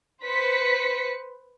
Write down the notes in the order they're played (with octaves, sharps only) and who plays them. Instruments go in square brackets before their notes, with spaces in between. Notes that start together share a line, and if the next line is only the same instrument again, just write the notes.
[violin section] B4 C5 B6 C#7